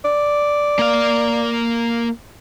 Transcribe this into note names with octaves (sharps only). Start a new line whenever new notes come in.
D5
A#3 F5